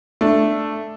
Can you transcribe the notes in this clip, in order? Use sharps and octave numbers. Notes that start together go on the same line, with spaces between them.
A3 D4